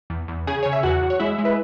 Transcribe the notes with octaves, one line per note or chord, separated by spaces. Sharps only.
E2
E2
C#3 G#4 G#5
C#3 C#5
E5
E2 F#4 F#5
E2
C#5
G#3 E4 E5
G#3
B4